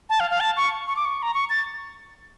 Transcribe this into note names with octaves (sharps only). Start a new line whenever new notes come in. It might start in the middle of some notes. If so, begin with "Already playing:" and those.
A5
F5
F5
A5
C#6
C#6
D6
C#6
A#5
C#6
A6